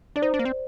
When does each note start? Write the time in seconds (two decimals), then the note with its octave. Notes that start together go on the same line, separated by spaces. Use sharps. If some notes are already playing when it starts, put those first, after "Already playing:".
0.16 D4 D5
0.22 D#4 C5
0.34 D4
0.39 A#3
0.45 C4